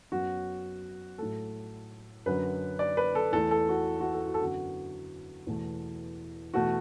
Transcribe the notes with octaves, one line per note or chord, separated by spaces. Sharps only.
F#2 F#3 B3 F#4
A2 F#3 A3 A4
F#2 D3 F#3 B4
D5
B4
A4
E2 E3 A3 A4
A4
F#4
F#4
A4
F#4
A4
F#2 D3 B3 F#4
E2 B2 A3
E2 B2 A3 F#4